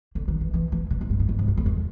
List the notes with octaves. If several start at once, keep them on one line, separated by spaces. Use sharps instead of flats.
D3
D#3
E3
E3
E3
A#2
G#2
G2
G#2
G2
G#2
F#2
F2
E2